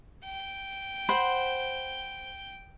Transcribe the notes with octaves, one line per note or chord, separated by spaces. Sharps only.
G5
C5 F#5 B5